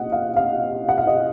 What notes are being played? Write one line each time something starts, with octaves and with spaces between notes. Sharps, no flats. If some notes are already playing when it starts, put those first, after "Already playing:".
Already playing: A#2 D#5 F#5
F5
F5
F#5
F5
D#5